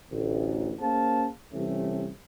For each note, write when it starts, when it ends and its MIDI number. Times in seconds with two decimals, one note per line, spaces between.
0.12 0.72 33
0.12 0.72 38
0.80 1.27 58
0.80 1.27 61
0.80 1.27 68
0.80 1.27 72
0.80 1.27 77
0.80 1.27 81
1.53 2.08 48
1.53 2.08 52
1.53 2.08 55
1.53 2.08 57
1.53 2.08 60
1.53 2.08 61